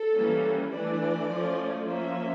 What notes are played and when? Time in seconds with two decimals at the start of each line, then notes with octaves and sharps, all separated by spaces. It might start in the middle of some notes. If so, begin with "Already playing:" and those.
Already playing: A4
0.15 E3 G3 A#3 C#4
0.73 E3 A3 D4 D5
1.31 F3 A3 C#4
1.89 F3 A#3 C#4 E5